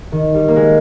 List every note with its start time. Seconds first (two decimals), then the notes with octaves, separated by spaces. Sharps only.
0.12 D#3
0.34 G3
0.48 A#3
0.56 G#3